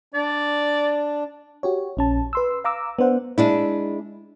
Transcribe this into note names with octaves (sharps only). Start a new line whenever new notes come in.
D4 D5
F#4 G4 C#5
A#1 C#4 A5
B4 C6 E6
F5 A#5 D6 E6
B3 D4 C5 F#5
G#3 D4 E4